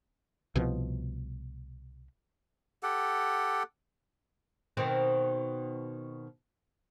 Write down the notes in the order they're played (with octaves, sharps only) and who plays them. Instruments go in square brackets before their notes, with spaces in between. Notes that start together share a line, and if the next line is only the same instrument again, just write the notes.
[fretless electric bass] C2 B2 F3
[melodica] G4 A4 F#5
[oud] B2 D#3 C4